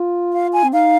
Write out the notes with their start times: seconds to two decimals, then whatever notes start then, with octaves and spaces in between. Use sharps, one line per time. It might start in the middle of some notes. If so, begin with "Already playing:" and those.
Already playing: F4
0.33 F5
0.53 G#5
0.64 C4
0.73 D#4 F5